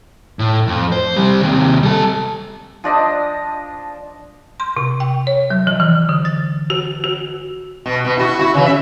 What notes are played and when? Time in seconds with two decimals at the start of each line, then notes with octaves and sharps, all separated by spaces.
0.39 A2
0.67 F2
0.92 C5
1.16 C3 G3
1.41 D#2 C3
1.83 G3 A4
2.84 F3 D4 D#5
4.60 C6
4.77 C3
5.00 G5
5.27 C#5
5.50 F#3
5.67 F3
5.80 E3
6.09 D3
6.25 A6
6.70 F#4
7.04 F#4
7.86 B2
8.05 B2 B3
8.17 E4 F#4
8.39 E4 F#4
8.54 C#3 E3
8.66 E5